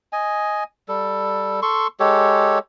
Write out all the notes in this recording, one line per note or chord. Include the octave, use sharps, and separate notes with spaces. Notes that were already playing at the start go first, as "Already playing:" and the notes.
D#5 G#5
G3 A4
A4 C6 C#6
G#3 G4 A4 C#5